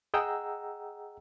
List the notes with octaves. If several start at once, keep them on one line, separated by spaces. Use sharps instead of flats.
G#4 D#5 F#5 G5 A#5 E6